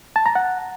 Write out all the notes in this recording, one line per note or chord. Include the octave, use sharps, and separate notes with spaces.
A5
A#5
F#5